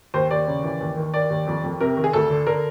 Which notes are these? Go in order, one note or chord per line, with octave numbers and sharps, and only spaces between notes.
D#2 C5
D#2 D5
C#3
E3
D#2
D#3
D#3 D5
D#2
F2
F2
C3 A#4
D#3
G#4
D2 A4
D3
D3 A#4